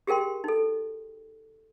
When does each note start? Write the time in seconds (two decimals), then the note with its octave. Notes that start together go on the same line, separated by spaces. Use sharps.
0.07 G4 G#4 A#4 G5 C6
0.44 D#4 A4